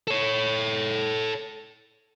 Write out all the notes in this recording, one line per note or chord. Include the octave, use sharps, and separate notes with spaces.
A4 C#5